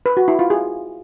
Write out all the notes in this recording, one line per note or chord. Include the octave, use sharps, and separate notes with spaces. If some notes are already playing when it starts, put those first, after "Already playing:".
B4
F#4
E4
F4
G#4